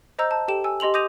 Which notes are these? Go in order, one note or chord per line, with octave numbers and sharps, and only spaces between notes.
C5 D#5 A#5 E6 G6
A5
G4 A4 G5 E7
G#5 E6
G4 D#5 C6 F7 F#7
D6 D#6 G6 A#6 D#7 F7